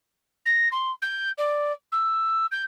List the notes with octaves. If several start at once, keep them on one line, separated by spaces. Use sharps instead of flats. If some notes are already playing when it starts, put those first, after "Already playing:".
A#6
C6
G6
D5
E6
G6